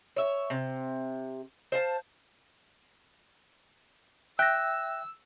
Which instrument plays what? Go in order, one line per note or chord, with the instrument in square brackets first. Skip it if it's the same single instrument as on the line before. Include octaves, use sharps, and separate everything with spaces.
[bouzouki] C#5 E5
C3
C5 F5 A5
[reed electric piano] E5 G5 [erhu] E6 [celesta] F#6 A#6